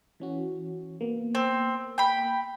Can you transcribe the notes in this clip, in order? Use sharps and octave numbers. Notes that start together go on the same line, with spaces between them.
E3 C#4 F#4
A#3 B3
C4
G5 B5